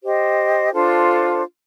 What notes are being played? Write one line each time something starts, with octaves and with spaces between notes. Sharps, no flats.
G4 C5 D#5
D4 F4 A4 C5